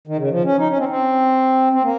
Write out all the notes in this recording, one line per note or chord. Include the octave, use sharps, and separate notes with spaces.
D#3
C#3
F3
C#4
D#4
C#4
C4
C4
C4
A#3